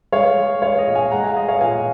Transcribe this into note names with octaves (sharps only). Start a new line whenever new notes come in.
G#3 C#5 F5
G#3
G#3 C#5 F5
D#5
A#2
F5 G#5
G#3 F#5 A#5
F5 G#5
G#3 D#5
C#5 F5
A#2 F5 G#5